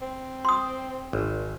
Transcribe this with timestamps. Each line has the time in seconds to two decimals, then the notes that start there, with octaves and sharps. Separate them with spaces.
0.02 C4
0.45 C6 D#6
1.13 G#1